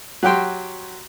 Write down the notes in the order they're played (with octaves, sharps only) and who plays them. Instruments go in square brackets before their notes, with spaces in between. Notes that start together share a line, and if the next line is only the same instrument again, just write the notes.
[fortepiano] F#3 F#4 G4 G5 C6